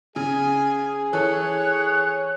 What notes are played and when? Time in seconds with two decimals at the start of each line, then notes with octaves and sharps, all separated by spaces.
0.16 C#3 G#4 G#5
1.13 E3 A4 C#5 F#6